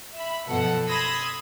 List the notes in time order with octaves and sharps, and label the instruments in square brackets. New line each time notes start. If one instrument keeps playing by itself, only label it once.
[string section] E5 B5
F#2 B2 F3 A4 F#5
B5 C6 D#6 E6 G#6 A#6